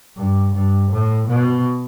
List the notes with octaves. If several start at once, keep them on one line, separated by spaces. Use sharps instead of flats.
G2
G2
A2
B2